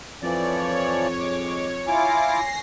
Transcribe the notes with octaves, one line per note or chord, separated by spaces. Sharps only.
F2 E3 F3 C#5 D5
G#3 D6
E4 F4 G#5 D6 A#6 C7